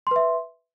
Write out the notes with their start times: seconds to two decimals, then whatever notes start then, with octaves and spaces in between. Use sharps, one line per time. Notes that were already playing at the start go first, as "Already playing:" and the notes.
0.07 C6
0.11 B4
0.16 E5